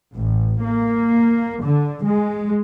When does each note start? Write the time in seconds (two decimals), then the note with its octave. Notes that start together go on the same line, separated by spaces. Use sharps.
0.15 A1
0.61 A#3
1.63 D3
2.04 G#3